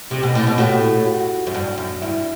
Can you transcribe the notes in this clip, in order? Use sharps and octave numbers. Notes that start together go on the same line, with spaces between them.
C3 G4
B2
A2
B2
A2 F#4
F#4
F#2
G2
F#2
G2 E4